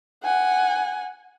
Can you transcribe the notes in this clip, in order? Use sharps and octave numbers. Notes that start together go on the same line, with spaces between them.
F#5 G#5